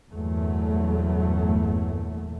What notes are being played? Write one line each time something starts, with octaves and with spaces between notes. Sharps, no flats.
G1 E2 A#2 F#3 A3